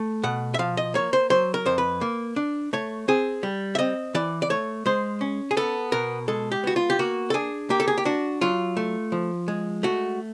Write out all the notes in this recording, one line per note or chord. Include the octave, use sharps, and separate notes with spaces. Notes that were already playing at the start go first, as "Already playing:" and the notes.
Already playing: A3
B2 F#5
E5
F3 F5
D#5
A#3 C#5
C5
F#3 C5
A#4
F2 C5
B4
A#3
D4
A3 C#5
C4 G#4
G3
E5
C4 D#5
E3 D5
D5
A3 C#5
G#3 C5
C#4
G#4
B3 A4
B2 A#4
G#3 A4
G4
B3 F#4
F4
G4
A#3 F#4
A4
D4 G#4
A#3 G4
A4
G#4
G4
D4 F#4
F#3 F4
A3
F3
G#3
A3 F#4